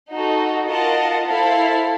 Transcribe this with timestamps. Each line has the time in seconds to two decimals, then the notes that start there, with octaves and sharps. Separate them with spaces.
0.11 D#4 F#4 A4
0.69 F4 A#4 D#5 F#5 A5
1.27 E4 A4 C5 F5